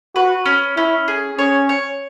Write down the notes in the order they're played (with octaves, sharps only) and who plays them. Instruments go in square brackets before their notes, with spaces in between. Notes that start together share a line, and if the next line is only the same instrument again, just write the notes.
[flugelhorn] F#4 [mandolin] B4
[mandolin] C#4
[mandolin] C#4 [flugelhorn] E4
[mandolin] G#4
[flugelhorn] C#4 [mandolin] C#5
[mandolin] C#5